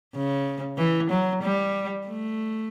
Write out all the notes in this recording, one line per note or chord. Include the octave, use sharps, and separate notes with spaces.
C#3
E3
F#3
G3
A3